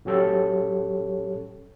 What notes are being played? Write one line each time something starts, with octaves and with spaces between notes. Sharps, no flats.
A2 F#3 C#4 G4 A4 C#5